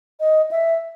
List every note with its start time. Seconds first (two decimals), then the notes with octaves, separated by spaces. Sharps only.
0.20 D#5
0.51 E5